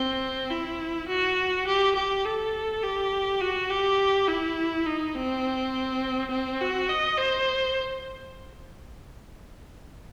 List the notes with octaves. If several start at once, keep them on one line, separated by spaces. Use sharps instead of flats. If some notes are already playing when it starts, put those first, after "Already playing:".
Already playing: C4
E4
F#4
G4
G4
A4
G4
F#4
G4
E4
D#4
C4
C4
F#4
D#5
C5